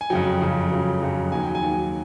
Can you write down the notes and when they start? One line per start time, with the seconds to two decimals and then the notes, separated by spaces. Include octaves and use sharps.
0.01 G#5
0.10 F2 C#3 F#3 G5
0.41 F2 C#3 F#3
0.71 F2 C#3 F#3
1.02 F2 C#3 F#3
1.32 D#2 D#3 F#3 G#5
1.43 G5
1.55 G#5
1.63 D#2 D#3 F#3